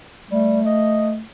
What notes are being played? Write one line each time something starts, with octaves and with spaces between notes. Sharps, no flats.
G3 A3
D#5